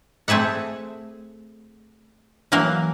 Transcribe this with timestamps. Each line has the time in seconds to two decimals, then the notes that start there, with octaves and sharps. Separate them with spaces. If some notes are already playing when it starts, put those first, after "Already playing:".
0.28 A3 C4 G#4 E5 F#5
2.52 E3 F#3 A#3 A#4